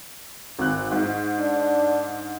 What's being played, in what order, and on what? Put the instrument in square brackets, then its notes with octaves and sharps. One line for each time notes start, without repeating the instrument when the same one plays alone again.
[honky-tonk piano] G#1 F#6
G#2
[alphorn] D4